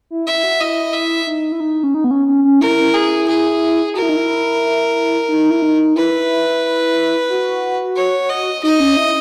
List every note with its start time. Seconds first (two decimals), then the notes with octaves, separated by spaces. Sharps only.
0.10 E4
0.27 E5
0.36 E4
0.43 F#4
0.60 E4 D#5
0.93 E5
1.27 D#4
1.52 E4
1.60 D#4
1.83 C#4
1.94 D#4
2.04 B3
2.11 C#4
2.27 C#4
2.44 C#4
2.61 E4 A#4
2.94 G#4
3.28 G#4
3.95 F#4 A#4
4.02 E4
4.09 D#4
4.16 E4
5.28 D#4
5.50 E4
5.62 D#4
5.96 E4 B4
7.30 F#4
7.96 C#5
8.30 D#5
8.63 D#4 D#5
8.80 C#4
8.97 E4